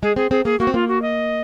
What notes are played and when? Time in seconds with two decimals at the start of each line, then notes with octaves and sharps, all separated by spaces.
0.02 G#3 G#4
0.16 C4 G#4
0.31 C4 G#4
0.45 A#3 G#4
0.60 A#3 F#4
0.67 C4
0.74 A#3 F4
0.88 F#4
1.02 D#5